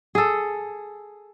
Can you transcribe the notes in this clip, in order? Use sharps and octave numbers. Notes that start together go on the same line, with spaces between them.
G#4 A4